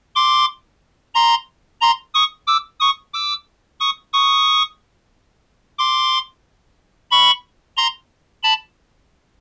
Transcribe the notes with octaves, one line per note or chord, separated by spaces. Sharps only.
C6 D6
A#5 C6
A#5 C6
C#6 D#6
D6 E6
C#6 D#6
D6 E6
C#6 D#6
C#6 D#6
C6 D6
B5 C#6
A#5 C6
A5 B5